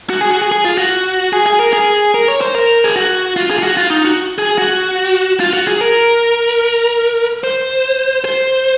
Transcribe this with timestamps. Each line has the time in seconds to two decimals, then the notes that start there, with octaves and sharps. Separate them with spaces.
0.10 F#4
0.21 G#4
0.30 F#4
0.41 G#4
0.52 G#4
0.64 F4
0.78 F#4
1.33 G#4
1.46 G#4
1.60 A#4
1.73 G#4
2.14 A#4
2.28 C#5
2.41 C5
2.55 A#4
2.84 G#4
2.96 F#4
3.36 F4
3.50 G#4
3.59 F4
3.63 F#4
3.77 F4
3.90 D#4
4.05 F#4
4.38 G#4
4.58 F#4
5.40 F4
5.53 F#4
5.67 G#4
5.81 A#4
7.44 C5
8.25 C5